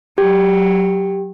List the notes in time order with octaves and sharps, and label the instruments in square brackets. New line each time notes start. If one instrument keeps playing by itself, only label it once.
[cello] F#3 [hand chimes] G4